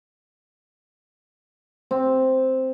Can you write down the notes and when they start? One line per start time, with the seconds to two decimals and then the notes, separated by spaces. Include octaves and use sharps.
1.91 C4